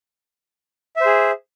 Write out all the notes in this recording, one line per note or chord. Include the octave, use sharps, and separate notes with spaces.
G#4 C5 E5